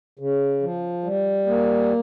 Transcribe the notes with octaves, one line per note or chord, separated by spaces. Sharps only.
C#3
F3
G3
A#3